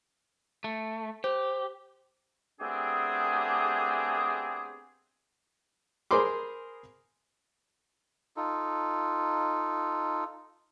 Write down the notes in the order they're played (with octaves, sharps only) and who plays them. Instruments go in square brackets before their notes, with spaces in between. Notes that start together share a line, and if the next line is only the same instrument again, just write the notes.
[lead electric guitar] A3
[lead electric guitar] G4 [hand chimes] C5
[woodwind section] A3 B3 C4 D4 G4 G#4
[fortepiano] G#4 A#4 C5 B5 C6 D6
[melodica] D#4 F4 A4